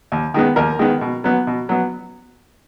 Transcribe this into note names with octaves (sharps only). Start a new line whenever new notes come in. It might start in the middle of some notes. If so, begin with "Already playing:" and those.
D#2
D#3 G#3 B3
D#2 A#4
D#3 G#3 B3
B2
F#3 B3
B2
F#3 B3